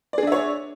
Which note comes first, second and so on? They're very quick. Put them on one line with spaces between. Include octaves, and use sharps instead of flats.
D5 G#4 D4 E5 C#5